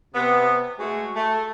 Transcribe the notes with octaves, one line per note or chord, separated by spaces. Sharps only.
C3 B3
G#3 A3 F#4
A3